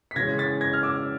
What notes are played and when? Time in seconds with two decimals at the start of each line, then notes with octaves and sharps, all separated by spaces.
0.11 B6
0.16 C#3 E3 G#3 C#4 G#6 A#6
0.38 A6 B6
0.61 G#6 A#6
0.73 F6
0.83 D6 E6